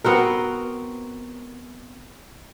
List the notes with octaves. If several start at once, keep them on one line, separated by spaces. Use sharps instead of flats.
B3 C4 F#4 A#4